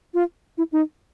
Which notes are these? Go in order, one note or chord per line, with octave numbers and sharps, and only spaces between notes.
F4
E4
D#4